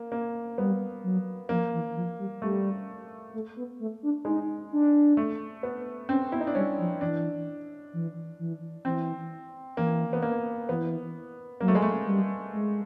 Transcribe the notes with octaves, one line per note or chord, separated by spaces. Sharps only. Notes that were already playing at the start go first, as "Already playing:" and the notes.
Already playing: A#3
A#3
G3 B3
F#3
F3 A#3
E3
F3
G3
G3 A3
A3
B3
A3
D4
G#3 D#4
D4
A3
B3
C4 C#4
B3 E4
D#4
D4
G3 C#4
F3
E3 D4
E3
E3
E3 C4
E3 A#3
B3
A#3
E3 B3
F#3 A#3
A3
G#3
A3
G3
G#3